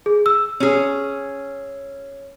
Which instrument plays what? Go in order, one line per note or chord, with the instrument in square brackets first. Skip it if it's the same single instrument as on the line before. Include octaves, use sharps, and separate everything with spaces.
[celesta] G#4
E6
[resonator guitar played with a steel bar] C#4 G#4